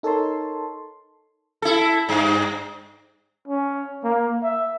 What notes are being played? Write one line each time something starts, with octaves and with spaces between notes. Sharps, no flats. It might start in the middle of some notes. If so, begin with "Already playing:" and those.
D#4 A4 A#4 C#5 A5 C6
E4 A4
G2
C#4
A#3
E5